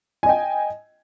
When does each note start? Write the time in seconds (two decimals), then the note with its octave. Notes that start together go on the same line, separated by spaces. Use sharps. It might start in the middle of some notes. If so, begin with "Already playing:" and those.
0.23 G#5
0.26 D#5
0.29 G5